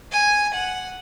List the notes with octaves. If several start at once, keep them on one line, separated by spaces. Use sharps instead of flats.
G#5
F#5